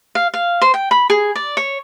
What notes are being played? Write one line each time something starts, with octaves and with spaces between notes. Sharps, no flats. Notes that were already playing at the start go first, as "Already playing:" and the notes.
F5
F5
C5
G5
B5
G#4
D5
C#5